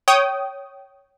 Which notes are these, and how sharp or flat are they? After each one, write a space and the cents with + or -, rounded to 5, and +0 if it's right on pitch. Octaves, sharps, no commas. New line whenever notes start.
C#5 +0 G5 -25 D#6 +0